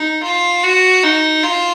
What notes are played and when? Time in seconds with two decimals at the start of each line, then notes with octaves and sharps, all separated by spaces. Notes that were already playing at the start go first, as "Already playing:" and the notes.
Already playing: D#4
0.23 F4
0.63 F#4
1.03 D#4
1.43 F4